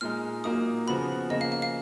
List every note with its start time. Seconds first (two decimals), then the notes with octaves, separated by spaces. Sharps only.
0.01 A#2 G#3 D#4 F6
0.44 A#2 F#3 A#3 D#4 D#6
0.87 C#3 F3 B3 F#4 B5
1.30 C#3 F3 A#3 D#5
1.41 F5
1.52 F5
1.62 F5